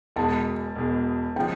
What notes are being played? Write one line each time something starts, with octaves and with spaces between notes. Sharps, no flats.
E1 E2 B2 G#3 A5
E1 E2 B2 G#3
C#3 F3 G#3 G5